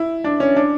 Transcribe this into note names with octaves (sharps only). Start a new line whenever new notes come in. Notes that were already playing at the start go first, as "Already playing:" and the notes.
Already playing: E4
D4
C#4
D4